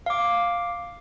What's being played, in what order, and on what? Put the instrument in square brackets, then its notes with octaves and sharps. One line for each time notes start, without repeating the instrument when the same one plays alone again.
[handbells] F5 D6